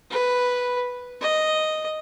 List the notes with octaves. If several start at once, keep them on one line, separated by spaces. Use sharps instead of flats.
B4
D#5